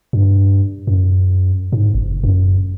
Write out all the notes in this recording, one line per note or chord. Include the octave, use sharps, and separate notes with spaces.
G2
F#2
G#2
F#1
F#2